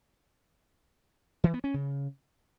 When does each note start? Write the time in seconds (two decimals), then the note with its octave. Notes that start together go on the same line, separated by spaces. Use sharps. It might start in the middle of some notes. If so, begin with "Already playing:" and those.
1.44 E3
1.54 B3
1.64 C#4
1.74 C#3